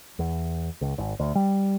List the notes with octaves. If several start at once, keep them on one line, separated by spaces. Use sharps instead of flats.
E2
C#2
G#1
D2
G3